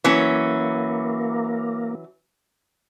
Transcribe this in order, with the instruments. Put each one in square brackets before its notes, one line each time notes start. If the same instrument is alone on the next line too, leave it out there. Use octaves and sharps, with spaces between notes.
[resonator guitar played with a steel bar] E3 F#3 C#4 [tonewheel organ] A#3